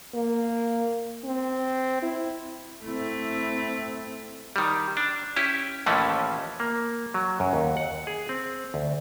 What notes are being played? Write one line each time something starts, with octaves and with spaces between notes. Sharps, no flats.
A#3
C4
E4
A3 C4 E4
D#3 G3
D4
C#4 E4 G4
D#2 A2 E3 F3 A3 C#4
A#3
F#3
F#2
D#2
F#5
G#4
C4
D2